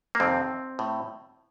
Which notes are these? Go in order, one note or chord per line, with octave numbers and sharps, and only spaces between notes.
A#3
F2 C3 D#3 C4
A2